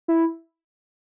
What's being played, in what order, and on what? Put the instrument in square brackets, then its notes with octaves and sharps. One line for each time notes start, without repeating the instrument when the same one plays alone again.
[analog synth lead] E4